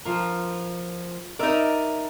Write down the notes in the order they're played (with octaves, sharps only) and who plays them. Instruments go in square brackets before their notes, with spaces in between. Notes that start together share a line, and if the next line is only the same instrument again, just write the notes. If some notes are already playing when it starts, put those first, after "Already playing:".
[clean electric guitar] F3 F4 A#4
[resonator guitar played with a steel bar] D#4 A#4 [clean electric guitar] D5 E5